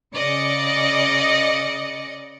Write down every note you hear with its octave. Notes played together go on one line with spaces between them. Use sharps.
C#3 D5 D#5 C#7